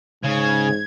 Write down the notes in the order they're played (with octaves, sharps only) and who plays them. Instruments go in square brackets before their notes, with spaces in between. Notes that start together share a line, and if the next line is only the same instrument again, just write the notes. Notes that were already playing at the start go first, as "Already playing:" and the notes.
[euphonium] G#2 [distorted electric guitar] C#3 [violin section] G#6